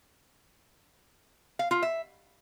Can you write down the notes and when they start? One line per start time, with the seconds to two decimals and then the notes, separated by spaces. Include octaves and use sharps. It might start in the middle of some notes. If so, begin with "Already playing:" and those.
1.59 F5
1.71 F4
1.82 E5